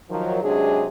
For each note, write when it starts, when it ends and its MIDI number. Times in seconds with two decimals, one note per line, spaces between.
0.10 0.42 51
0.10 0.42 53
0.10 0.42 54
0.43 0.86 48
0.43 0.86 54
0.43 0.86 56
0.43 0.86 61
0.43 0.86 62
0.43 0.86 68